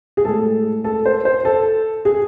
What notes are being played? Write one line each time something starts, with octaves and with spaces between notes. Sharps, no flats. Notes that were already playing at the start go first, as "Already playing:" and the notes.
G#4
A2 G#3 A4
A4
C5
C5
A4
G#4